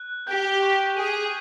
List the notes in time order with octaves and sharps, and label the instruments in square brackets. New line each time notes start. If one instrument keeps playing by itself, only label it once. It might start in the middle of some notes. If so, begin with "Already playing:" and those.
Already playing: [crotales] F#6
[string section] G4 [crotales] G6
[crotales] C#6
[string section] G#4 [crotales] D#7